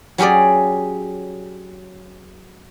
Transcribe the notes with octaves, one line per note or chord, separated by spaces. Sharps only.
F#3 C#4 G4 G#4 D5